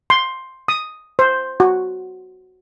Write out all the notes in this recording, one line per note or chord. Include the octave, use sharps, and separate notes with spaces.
C6
D#6
C5
F#4